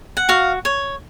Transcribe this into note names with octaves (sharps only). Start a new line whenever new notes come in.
F#5
F#4 F5
C#5